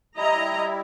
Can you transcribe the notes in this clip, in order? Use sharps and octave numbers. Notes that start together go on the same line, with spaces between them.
G3 E4 D#5 A#5